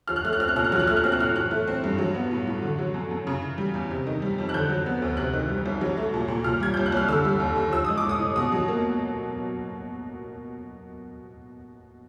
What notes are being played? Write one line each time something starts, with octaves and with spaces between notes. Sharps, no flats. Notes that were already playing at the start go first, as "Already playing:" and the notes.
F3 F6
F#6
A3 F6
F#6
C4 F6
F#6
A#2 F6
F#6
F#3 F6
F#6
A3 F6
F#6
C4 F6
F#6
A2 F6
E3 F#6
A3
C4
G2
F#3
B3
A2
A2
D3
F#3
F#2
F#2
C#3
E3
G3
E2
C3
D#3
G3
F2
F#6
D3 G6
F#3
B3
D2
C3 F#6
D#3
G3
C2
F#3
A3
A#2
A#2
A#2 F6
G3 G#6
C2 G6
F#6
C2 F6
D3 E6
G3
D#2
D#2
F3 E6
G#3 D#6
D6
A2
D#6
A2
B2 D#6
F#3
A#3